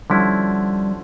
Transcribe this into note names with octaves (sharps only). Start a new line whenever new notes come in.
D3 F3 G3 C#4 E4